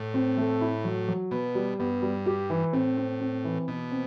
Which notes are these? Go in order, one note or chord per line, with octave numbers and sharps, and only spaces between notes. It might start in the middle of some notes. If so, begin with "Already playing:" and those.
Already playing: A2
C4
A3
E4
F#3
F#3
B2 B3
G3
G2 B3
G3
G4
E3
A2 C4
C4
C4
E3
B2 E3
C4